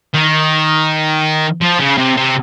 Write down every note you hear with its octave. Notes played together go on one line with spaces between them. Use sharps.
D#3
F3
C#3
C3
C3